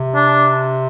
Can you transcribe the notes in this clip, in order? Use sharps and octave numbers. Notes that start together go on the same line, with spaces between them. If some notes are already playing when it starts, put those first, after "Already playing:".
Already playing: C3
D4